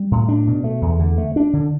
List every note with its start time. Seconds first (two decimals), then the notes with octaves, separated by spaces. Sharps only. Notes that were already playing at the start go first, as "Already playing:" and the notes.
Already playing: G3
0.11 A2
0.28 D4
0.47 B2
0.64 A3
0.82 E2
1.00 D3
1.18 A3
1.36 D4
1.53 D3